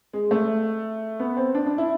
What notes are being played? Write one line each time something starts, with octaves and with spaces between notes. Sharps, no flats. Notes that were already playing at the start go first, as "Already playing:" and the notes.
G#3
A3
B3
C4
D4
D4
E4